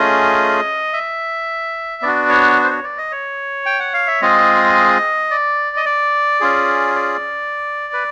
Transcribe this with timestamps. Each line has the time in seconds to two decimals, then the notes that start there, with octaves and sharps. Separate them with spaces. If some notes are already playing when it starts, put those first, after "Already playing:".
Already playing: A3 C#4 F4 G#4 D#5
0.93 E5
2.02 B3 D4 F#4 D5
2.29 C#5
2.64 C5
2.71 C#5
2.84 D5
2.98 D#5
3.12 C#5
3.66 G5
3.80 F#5
3.93 F5
4.07 E5
4.22 G#3 C4 F4 G#4 D#5
5.31 D5
5.76 D#5
5.86 D5
6.40 C#4 F4 G#4
6.95 D5
7.93 B4